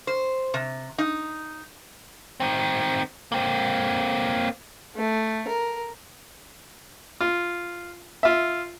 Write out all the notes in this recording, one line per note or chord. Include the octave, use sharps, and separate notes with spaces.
C5
C3
D#4
D#3 C4
A#3 C4
A3
A#4
F4
F4 E5